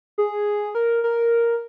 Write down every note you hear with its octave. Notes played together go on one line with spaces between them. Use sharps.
G#4
A#4
A#4